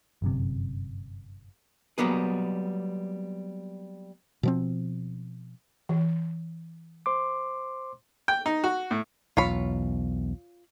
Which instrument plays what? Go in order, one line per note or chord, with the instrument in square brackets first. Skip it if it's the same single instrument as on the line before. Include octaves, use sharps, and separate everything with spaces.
[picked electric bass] G1 F#2 C3
[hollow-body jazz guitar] F#3 G3 A#3 B3 G#4
[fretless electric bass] B2 F3 C4
[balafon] E3
[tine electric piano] C5 C6 D6
[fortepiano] G5
D#4
F#4
A2
[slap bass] B1 E2 [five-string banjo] F4 C#5 B5